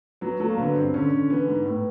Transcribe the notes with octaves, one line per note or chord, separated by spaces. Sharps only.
F#3 B3
F#3 A3
A#3
D3 B3
G2 C4
D3 C#4
D3
E3 B3
G#2
A2 B3